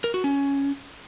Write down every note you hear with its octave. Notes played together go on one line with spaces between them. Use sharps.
A#4
F#4
C#4